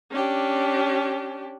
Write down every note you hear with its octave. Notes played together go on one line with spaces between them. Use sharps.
C#4 D4 G4